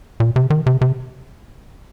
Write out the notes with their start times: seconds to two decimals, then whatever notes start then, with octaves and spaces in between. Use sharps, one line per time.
0.20 A#2
0.36 C3
0.50 D#3
0.66 C3
0.81 C3